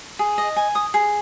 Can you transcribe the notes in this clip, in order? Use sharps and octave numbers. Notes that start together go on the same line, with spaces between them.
G#4
D#5
G#5
D#6
G#4